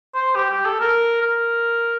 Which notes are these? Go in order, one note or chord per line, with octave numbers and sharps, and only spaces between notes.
C5
G4
G4
A4
A#4
A#4